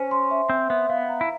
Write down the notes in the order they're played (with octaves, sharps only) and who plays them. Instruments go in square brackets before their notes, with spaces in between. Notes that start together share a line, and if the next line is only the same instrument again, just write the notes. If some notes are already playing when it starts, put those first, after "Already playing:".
Already playing: [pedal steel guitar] C#4 [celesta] C5
[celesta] C6
E5
[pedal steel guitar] C4 [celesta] E5
[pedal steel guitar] B3 [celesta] E5
[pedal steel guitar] B3 [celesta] F5
[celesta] A#5
[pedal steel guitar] E4